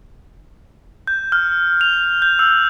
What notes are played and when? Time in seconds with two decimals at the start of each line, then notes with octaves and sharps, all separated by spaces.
1.07 G6
1.32 F6
1.81 F7
2.22 G6
2.39 E6